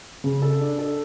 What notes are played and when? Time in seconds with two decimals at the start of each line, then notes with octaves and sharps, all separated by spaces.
0.24 C#3
0.42 A4
0.60 D4
0.78 A4